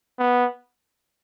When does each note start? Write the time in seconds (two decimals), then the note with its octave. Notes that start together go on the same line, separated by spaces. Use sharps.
0.19 B3